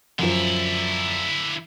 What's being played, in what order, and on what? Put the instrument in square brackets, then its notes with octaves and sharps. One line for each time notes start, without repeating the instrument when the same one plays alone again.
[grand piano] F#2 F3 [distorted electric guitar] D3 E4